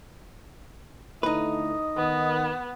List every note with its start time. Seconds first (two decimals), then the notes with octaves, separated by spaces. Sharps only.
1.23 D3 A3 D#4 E4 B4 D#5
1.97 D#3 B3